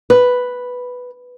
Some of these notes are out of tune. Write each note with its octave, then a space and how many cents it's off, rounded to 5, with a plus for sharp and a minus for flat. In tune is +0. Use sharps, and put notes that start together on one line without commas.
B4 +0